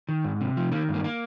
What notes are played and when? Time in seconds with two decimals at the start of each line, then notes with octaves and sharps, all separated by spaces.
0.09 D#3
0.24 G#2
0.41 C3
0.57 F3
0.72 D#3 A#3
0.89 G2
0.94 A#3
1.04 A#3